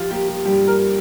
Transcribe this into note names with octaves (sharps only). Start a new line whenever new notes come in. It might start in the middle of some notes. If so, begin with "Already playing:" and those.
Already playing: F3 F4 G4
A#3 G4
G4
G2 G4
A#4